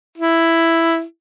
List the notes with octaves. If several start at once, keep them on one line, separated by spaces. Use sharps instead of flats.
E4